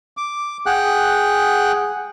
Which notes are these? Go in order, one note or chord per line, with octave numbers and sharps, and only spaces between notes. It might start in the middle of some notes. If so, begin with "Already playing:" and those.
D6
G#4 F#5 G5 F#6